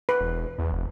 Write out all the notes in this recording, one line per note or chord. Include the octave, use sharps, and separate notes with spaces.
B4
E1
E2
F1